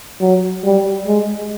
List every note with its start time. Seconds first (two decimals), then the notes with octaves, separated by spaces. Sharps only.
0.21 F#3
0.64 G3
1.07 G#3